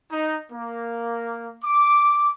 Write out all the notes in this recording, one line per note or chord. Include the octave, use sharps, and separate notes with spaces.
D#4
A#3
D6